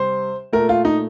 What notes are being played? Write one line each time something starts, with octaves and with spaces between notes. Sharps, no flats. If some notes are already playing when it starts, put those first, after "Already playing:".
Already playing: C3 G3 C5
A#2 A3 A#4
F4
D#4